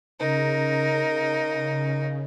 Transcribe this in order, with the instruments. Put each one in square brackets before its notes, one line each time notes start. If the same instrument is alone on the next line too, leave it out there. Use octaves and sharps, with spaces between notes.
[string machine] C#3 [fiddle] D#4 A#4